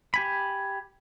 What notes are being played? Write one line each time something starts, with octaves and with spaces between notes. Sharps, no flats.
G4 G#5 B5